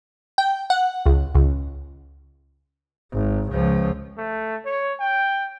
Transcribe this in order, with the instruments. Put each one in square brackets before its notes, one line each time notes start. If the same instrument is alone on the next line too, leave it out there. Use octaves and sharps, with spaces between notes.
[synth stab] G5
F#5
C#2
C#2
[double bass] G#1
C#2 F3
[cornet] A3
C#5
G5